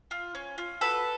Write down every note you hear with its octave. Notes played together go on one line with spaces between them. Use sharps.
F4
C#4
F4
F#4 A4 B4